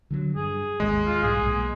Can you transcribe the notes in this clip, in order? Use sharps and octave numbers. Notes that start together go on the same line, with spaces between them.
D3 F3 F#3
G2 G#4
G#1 D#2 G#3
F4
B1 G#2 G3 G#4
B1 A#2